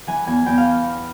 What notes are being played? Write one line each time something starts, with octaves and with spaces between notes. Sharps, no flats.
E3 G#5
E2 G#5
E2 G5
F5